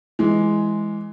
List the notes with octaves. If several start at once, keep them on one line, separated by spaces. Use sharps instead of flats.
E3 G#3